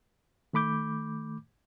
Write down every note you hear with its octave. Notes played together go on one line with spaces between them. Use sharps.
D#3 A3 B5 D6 G6